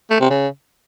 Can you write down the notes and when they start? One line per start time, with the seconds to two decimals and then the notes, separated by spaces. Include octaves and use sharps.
0.11 A3
0.20 C3
0.30 C#3